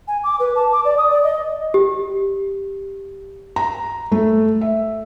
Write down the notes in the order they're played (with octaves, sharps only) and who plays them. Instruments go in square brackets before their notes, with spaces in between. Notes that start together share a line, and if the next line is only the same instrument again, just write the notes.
[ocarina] G#5
D6
B4
A5
D6
D5
D#6
D5
D#5
[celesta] G4
[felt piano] A#5
A3
E5